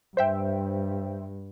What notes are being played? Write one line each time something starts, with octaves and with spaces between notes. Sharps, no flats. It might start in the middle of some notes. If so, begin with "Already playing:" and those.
G2 C5 E5 G5